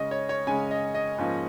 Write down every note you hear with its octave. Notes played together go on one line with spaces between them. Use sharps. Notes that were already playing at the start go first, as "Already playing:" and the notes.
Already playing: C#3 G#3 C#4 D#5
C#5
C#5
C#3 G#3 C#4 G#5
D#5
D#5
G#2 F3 A#3 C#4